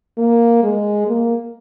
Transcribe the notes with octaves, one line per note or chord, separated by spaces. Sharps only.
A#3
G#3
A#3